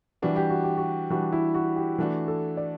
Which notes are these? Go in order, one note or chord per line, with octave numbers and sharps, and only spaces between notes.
E3 G3 D4 F#4
G4
F#4
G4
F#4
E3 G3 D4 F#4
E4
F#4
G4
E3 A3 D4 F#4
A4
D5